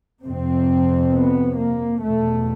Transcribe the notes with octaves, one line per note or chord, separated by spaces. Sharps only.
F2 C3 C4
B3
A#3
E2 B2 A3